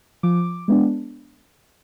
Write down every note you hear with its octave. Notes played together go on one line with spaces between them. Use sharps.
F3 D6
G#3 B3 D4